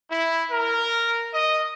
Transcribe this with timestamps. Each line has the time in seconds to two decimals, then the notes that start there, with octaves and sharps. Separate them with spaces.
0.10 E4
0.51 A#4
1.34 D#5